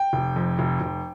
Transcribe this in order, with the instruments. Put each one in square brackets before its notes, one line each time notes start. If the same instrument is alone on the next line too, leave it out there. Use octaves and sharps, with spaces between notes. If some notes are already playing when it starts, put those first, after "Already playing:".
Already playing: [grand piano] G5
F1
F2
F1
F1